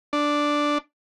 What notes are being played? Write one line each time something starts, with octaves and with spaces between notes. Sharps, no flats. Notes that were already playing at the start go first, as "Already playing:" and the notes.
D4